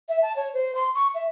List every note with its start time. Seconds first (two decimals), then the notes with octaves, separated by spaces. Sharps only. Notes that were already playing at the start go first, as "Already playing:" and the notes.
0.09 E5
0.22 A5
0.36 C#5
0.54 C5
0.75 C6
0.95 C#6
1.14 E5